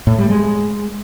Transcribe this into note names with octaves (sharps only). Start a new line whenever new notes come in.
A2
G3
G#3